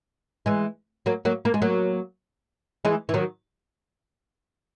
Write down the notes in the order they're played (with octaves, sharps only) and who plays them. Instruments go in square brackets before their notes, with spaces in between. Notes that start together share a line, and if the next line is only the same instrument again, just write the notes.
[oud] E3 G#3
F#3 A#3
F#3 A#3
A#3
G#3
F#3 A#3
E3 G#3
E3
D#3 F#3